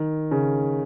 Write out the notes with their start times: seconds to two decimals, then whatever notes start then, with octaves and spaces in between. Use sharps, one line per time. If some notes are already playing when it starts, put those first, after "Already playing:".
Already playing: D#3
0.31 C#3